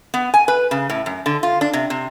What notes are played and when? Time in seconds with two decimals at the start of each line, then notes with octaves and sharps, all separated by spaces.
0.14 B3
0.34 G#5
0.48 B4
0.71 C#3
0.90 A2
1.06 F#2
1.26 D3
1.43 F4
1.61 D4
1.73 C3
1.90 C3